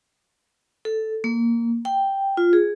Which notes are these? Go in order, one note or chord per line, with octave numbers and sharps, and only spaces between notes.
A4
A#3
G5
F4
G#4